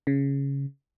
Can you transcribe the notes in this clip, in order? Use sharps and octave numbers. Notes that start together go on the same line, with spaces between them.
C#3